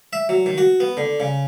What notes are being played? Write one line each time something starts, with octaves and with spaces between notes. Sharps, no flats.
E5
F#3
D#3
F#4
B3
D3
C#3